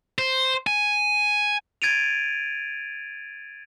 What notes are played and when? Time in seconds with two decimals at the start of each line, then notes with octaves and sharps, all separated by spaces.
0.18 C5
0.67 G#5
1.82 G#6 A6 D7 D#7 F7